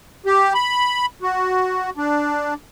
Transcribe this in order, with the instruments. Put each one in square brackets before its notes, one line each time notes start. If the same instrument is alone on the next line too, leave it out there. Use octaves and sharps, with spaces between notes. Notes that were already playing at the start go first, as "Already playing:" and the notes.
[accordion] G4
B5
F#4
D4